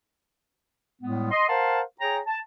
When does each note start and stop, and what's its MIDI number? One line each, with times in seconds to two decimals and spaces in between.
1.02 1.30 45
1.02 1.30 55
1.02 1.30 56
1.02 1.30 59
1.31 1.48 75
1.31 1.48 84
1.49 1.81 70
1.49 1.81 72
1.49 1.81 77
1.49 1.81 78
1.49 1.81 81
1.49 1.81 84
2.00 2.20 68
2.00 2.20 73
2.00 2.20 79
2.00 2.20 82
2.27 2.39 81